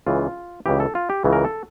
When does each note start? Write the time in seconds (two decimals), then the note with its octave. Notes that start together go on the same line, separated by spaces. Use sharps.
0.07 C#2 C#3 E3 F4
0.66 C#2 C#3 E3 G4
0.80 A4
0.95 F4
1.10 G4
1.24 C#2 C#3 E3
1.33 A#4
1.45 A4